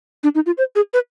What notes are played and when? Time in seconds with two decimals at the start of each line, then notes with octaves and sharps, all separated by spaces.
0.23 D4
0.35 D#4
0.46 F4
0.58 C5
0.75 G#4
0.93 B4